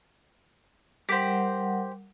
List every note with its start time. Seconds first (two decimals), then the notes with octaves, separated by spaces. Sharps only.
1.09 G3 G4 A#4 C5 F#5